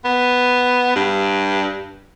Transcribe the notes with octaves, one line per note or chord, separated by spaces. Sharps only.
B3
G2